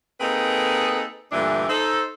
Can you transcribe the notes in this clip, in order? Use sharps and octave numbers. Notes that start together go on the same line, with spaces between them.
A#3 C4 D#4 G#4 A4 B4
G2 A#2 D3 E3 A3 D4
D#4 A4 C5